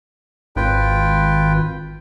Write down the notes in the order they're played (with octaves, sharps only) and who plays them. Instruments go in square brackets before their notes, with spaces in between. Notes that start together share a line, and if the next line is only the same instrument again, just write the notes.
[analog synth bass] G#1 [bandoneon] F4 B4 G5